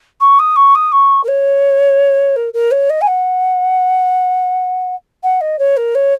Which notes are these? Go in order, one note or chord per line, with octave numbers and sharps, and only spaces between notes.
C#6
D#6
C#6
D#6
C#6
A#4
C#5
A#4
A#4
C#5
D#5
G#5
F#5
F#5
D#5
C#5
A#4
C#5